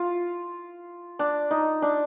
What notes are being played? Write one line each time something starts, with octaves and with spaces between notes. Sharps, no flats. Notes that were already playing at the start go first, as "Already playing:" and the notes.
Already playing: F4
D4
D#4
D4